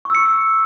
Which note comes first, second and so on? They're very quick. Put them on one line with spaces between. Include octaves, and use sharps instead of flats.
C#6 E6 C#7